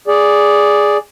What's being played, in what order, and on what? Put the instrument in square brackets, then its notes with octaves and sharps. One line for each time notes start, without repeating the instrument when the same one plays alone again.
[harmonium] G#4 D5